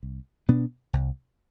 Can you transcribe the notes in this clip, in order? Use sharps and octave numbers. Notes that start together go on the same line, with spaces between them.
C2
B2 B3 D4
C2